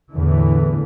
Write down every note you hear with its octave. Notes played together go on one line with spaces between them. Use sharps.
E2 A2 D3 E3